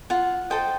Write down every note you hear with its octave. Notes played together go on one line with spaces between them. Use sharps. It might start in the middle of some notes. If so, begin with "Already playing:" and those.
F4 F#5
A4 C5 D#5 G5